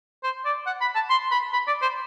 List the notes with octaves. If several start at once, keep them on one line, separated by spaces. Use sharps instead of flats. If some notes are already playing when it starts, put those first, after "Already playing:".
C5
D5
F#5
B5
A5
C6
B5
B5
D5
C5